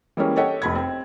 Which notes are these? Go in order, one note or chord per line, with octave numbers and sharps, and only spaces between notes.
E3 G3 G#3 A#3 C#4
G4 A4 C#5 D#5 F#5
F1 B5 G#6
C4